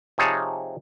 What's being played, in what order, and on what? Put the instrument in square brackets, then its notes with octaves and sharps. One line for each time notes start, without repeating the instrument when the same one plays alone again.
[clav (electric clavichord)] C3 F3 D#4 G#4 C#5 A5